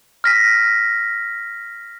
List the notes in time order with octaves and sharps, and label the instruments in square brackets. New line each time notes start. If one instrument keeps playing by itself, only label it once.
[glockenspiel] F6 A#6 B6